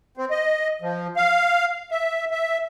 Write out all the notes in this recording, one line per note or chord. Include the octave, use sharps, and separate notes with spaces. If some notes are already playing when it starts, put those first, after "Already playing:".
C4
D#5
F3
F5
E5
E5